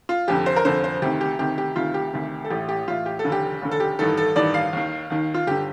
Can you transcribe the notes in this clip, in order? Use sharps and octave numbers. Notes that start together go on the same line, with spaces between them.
F4
F1 F2 D3 G4
C5
A#4
F1 F2 D3 C5
C5
D2 C3 D#3 G4
G4
D2 C3 D#3 G4
G4
D2 C3 D#3 F4
G4
D2 C3 D#3
A4
A1 A2 G4
G4
A1 A2 F4
G4
A4
F1 D#2 D3
G4
F1 D#2 D3
A4
G4
A1 G2 D#3 A4
A4
A1 G2 D#3 D5
F5
D#2 D#3
D#2 D#3
F4
G1 D3 G4